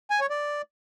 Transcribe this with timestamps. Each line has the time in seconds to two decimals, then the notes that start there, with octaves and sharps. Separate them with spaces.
0.11 G#5
0.20 C#5
0.30 D5